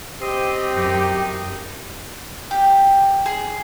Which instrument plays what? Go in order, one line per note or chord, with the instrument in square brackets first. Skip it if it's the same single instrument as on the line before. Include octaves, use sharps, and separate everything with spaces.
[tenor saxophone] C4 [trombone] G4 [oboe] D#5
[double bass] F#2 [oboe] D#4
[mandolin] G4
G#4